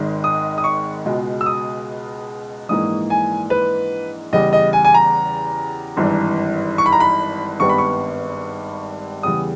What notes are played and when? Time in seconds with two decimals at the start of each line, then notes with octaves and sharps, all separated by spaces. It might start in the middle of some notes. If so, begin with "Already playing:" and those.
Already playing: G#1 G#2 D#3 G#3
0.24 D#6
0.58 D#6
0.64 C#6
1.06 C#2 B2 G#3
1.41 E6
1.46 D#6
2.69 A#1 G#2 E3 A#3 D#6
3.10 G#5
3.50 B4
4.33 E2 C#3 G3 D#5
4.53 D#5
4.73 G#5
4.85 G#5
4.94 A#5
5.97 G#1 G2 E3
6.78 C#6
6.86 B5
6.92 A#5
7.00 B5
7.59 G#1 G2 G3 B3 C#6
7.69 B5
7.78 C#6
9.23 E2 C#3 G3 D#6